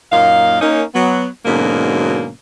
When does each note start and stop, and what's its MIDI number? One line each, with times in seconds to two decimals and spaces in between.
0.11 0.58 42
0.11 0.58 46
0.11 0.58 58
0.11 0.58 63
0.11 0.58 77
0.61 0.82 58
0.61 0.82 61
0.61 0.82 63
0.95 1.27 54
0.95 1.27 59
1.46 2.29 44
1.46 2.29 47
1.46 2.29 50
1.46 2.29 54
1.46 2.29 58
1.46 2.29 61